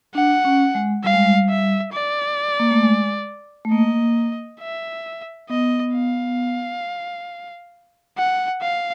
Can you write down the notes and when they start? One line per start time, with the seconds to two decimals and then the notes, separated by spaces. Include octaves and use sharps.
0.15 D4 F#5
0.45 C#4
0.75 G#3
1.04 G3 F5
1.14 G#3
1.23 G3
1.49 E5
1.93 D5
2.60 A#3
2.71 A3
2.83 G#3
3.65 A3
3.72 A#3 D#5
4.60 E5
5.50 B3 D#5
5.95 F5
8.18 F#5
8.62 F5